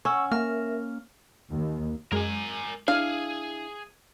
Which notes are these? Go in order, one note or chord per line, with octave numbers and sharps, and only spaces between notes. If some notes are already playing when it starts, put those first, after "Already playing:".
C#4 F#5 C#6 E6
A#3 A#4 E5 F6
D#2
F#2 G#3 A#4 G#5
D4 E4 G#4 F5